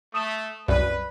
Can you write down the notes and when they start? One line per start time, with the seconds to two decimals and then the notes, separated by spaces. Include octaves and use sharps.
0.14 A3 D#6 E7
0.68 C2 F#2 B4 D5